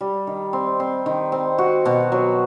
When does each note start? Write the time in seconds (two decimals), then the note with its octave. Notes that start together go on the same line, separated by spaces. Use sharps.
0.01 G3
0.27 D#3
0.53 C4
0.80 C4
1.06 D#3
1.32 C4
1.58 F#4
1.85 B2
2.12 F#3